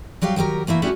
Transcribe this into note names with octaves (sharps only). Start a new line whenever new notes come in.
F#3 G3 G4 F5
D#3 F#3 G4 A#4
E3 A3 A#3 E4
A3 C#4 D4 E4 F#4 G4